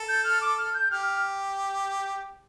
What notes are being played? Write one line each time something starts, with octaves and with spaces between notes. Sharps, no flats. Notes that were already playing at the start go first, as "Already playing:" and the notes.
Already playing: A4
G6
F6
D6
F6
G6
G4 F6
F6